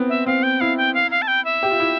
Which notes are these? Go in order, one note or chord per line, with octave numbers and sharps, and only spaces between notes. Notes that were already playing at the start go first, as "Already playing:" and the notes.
Already playing: B3 C4
E5
C4 F5
G5
E4 F5
G5
F5
F5
A5
G5
E5
G4
F4
E4